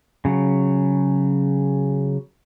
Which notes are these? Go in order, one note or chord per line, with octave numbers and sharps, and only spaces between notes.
C#3 F#3